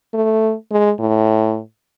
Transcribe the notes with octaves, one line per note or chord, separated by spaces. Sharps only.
A3
G#3
A2